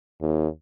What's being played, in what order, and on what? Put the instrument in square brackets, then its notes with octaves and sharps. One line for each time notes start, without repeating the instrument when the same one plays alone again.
[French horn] D#2